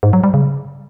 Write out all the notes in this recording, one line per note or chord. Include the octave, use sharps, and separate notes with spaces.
G#2
F#3
G3
C#3